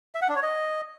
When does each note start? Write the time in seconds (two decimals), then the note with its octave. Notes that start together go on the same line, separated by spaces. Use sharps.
0.15 E5
0.22 F#5
0.29 D4
0.36 C#5
0.43 D#5